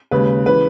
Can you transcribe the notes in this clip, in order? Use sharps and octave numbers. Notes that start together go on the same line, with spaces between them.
D#2 C#3 G#3 B4
C#3 E3 B4